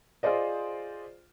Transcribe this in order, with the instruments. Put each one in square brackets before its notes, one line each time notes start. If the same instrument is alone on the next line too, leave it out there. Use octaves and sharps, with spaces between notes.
[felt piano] F4 G#4 C5 D5 D#5